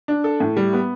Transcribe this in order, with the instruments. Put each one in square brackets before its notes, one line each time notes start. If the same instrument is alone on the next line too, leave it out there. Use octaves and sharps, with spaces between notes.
[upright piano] D4
A4
A2
G3
B3